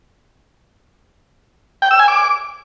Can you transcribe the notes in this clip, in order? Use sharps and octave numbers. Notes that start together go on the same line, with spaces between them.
G5
E6
G#5
D6